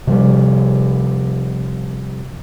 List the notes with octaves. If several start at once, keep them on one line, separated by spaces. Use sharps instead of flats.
C3 F3 G3